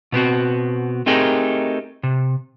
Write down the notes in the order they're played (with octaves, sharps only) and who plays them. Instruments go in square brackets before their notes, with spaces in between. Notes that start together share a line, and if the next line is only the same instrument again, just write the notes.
[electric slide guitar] B2 B3 C4 F#4
A3 C4 D#4 G4 G#4 A#4
C3